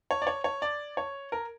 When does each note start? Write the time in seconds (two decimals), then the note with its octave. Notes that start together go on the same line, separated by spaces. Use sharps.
0.11 C#5
0.22 D5
0.27 C#5
0.44 C#5
0.62 D5
0.97 C#5
1.32 A#4